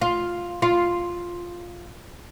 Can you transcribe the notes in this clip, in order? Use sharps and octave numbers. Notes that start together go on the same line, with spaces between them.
F4
F4